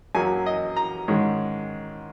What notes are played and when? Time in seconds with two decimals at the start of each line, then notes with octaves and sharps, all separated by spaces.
0.15 F#2 F#3 A#3 C#4 G#5
0.46 D#5
0.76 A#5
1.08 G#2 D#3 G#3 C#4